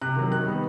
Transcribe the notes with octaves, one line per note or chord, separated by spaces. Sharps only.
C3 F#6
D#3 F#3
D#3 F#6
G3 B3 D#4